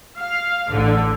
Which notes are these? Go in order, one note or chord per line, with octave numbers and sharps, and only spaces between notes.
F5
A1 D3